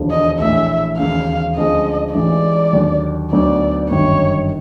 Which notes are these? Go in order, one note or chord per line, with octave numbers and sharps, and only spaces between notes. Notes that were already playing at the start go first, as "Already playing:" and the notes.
Already playing: E1 D#2 D3 F3
D#5
A#1 A2 E3 A3 E5
E1 D#2 C#3 F5
D2 C#3 F3 G#3 D#5
A1 G#2 E3 G#3 D5
D#2 D3 F#3
D2 D3 F#3 B3 D#4 D5
G1 F#2 D#3 F#3 A#3 C#5